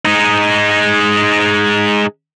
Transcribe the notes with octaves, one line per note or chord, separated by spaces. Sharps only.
G#3 D#4